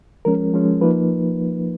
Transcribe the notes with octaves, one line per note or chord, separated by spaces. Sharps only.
F3 G#3 C#4 A#4
F3 G#3 C#4
F3 A#3 D#4 B4